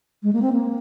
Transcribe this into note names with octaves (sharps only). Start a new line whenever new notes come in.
G#3
A#3
C4
A#3